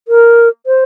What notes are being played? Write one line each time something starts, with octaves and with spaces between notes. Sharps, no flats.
A#4
C5